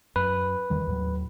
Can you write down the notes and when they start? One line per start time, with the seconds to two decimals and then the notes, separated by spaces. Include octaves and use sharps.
0.16 F#2 B4
0.70 E2 D#3 G3
0.87 D#2 A2 F#3